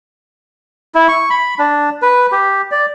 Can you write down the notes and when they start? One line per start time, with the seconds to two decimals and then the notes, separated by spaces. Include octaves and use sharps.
0.95 E4
1.08 C#6
1.30 B5
1.59 D4
2.02 B4
2.32 G4
2.71 D5